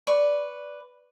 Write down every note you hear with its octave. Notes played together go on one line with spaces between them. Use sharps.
B4 D5 C#6